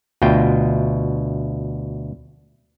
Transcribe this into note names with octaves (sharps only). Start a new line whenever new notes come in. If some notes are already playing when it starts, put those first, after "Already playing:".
D2 B2 F4 G5